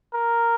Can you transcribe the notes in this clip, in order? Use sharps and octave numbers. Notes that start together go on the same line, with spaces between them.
A#4